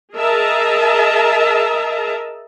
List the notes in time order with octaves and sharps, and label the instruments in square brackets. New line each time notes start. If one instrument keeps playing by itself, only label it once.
[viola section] G#4 A#4 D#5 E5 A5 A#5